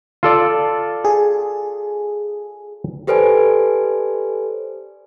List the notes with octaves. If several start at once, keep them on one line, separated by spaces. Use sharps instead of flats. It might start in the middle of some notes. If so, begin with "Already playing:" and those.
F4 A4 D5
G#4
G4 A4 B4 C5 D5 G#5